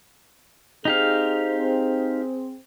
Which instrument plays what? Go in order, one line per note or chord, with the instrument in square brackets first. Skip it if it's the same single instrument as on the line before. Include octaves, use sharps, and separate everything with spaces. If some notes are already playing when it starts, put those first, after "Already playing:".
[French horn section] C4 G#4 [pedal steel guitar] D#4 G4 F5